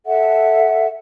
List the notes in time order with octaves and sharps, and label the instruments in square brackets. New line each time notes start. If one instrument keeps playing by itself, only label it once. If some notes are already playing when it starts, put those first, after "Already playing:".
[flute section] A4 E5 F#5